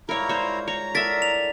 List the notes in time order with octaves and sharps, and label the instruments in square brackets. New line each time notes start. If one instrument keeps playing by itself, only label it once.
[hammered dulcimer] G#2 G3 F4 [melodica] E4 A#5 [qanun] A#4 C#5
[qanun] C5 C#5
[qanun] C#5 [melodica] A#5
[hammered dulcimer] D3 E4 D#5 [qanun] A#4 E5 [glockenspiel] A6 B6
[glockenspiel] F7